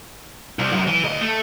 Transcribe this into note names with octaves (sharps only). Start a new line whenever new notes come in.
C2
F#2
E3
D2 D#5
A3